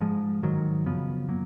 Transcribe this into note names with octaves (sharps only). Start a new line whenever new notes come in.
G#2 F3 G#3
G#2 D#3 F#3
F#2 C#3 F3 B3
F#3 A#3